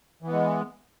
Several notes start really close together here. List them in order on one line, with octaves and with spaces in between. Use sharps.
E3 B3 G#3